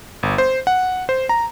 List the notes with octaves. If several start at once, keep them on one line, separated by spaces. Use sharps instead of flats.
G1
C5
F#5
C5
A#5